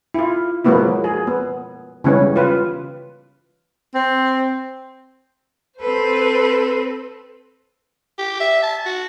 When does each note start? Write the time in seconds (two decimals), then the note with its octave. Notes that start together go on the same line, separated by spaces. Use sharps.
0.14 E4 F4
0.64 F3 F#3 G#3 A#3 B3 E4
1.04 G#4
1.27 B3
2.04 C#3 E3 G3 G#3 B3 C#4
2.36 F4 B4
3.95 C4
5.80 C4 A4 B4 C5
8.19 G4
8.40 E5
8.63 A5
8.86 F#4